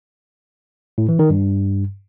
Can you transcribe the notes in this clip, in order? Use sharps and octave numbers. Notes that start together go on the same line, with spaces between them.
A2
E3
D#3
G2